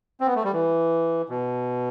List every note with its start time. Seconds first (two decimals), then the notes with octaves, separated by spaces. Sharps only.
0.20 C4
0.27 B3
0.35 A3
0.44 G3
0.53 E3
1.29 B2